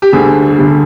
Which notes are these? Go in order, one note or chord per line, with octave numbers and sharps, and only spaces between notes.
G4
D2 D3 G3 G#4
D3 G3